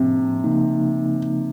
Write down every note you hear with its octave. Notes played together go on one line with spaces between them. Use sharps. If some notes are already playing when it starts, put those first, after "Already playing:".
Already playing: A2 C3 F3 A#3 D4
C#3 F3 A#3 D#4